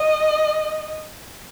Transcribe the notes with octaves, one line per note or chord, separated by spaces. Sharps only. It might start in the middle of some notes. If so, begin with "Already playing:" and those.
Already playing: D#5